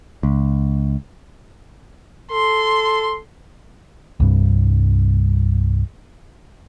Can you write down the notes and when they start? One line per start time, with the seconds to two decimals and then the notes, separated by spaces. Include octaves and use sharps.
0.23 C#2
2.31 A4 C6
4.20 C2 G2